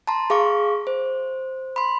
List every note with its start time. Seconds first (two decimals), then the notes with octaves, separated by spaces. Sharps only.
0.07 A5 A#5 C6
0.30 G#4 F5 C#6 D6
0.87 C5
1.76 B5 C6